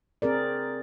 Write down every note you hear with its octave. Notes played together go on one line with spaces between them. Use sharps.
C4 G#4 A#4 D5